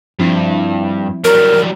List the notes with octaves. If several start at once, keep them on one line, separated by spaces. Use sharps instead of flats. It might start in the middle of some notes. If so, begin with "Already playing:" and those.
G2 F3 C4 E4
F#3 G3 A#4